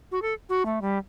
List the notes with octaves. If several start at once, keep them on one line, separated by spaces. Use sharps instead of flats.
F#4
A4
F#4
A3
G3